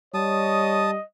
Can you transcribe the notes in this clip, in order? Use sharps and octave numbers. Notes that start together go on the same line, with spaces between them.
G3 C#5 D#5 A5 D#6